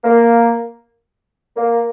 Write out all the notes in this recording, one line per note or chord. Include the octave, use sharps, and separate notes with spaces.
A#3
A#3